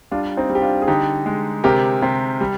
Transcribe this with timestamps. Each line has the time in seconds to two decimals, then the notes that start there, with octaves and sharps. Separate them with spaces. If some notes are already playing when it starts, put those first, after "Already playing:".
0.11 G3 D4 F4
0.37 C4 D#4
0.49 G3
0.55 G4
0.62 D4 F4
0.82 G#4
0.87 D3 D#4 G4
1.26 G#3
1.64 C3 G4 A#4
2.02 C3
2.41 G3